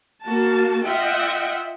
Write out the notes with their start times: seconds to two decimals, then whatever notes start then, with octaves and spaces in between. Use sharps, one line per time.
0.24 A#3 F#4 A5
0.85 F4 D#5 E5 F#5 G5